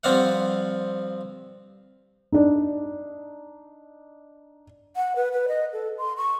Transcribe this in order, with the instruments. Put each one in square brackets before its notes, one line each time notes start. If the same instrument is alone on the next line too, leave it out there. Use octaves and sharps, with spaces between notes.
[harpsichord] G2 F3 C4 D5 F5 F#5
[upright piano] D4 D#4
[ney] F#5
B4
B4
D#5
A4
C6
C#6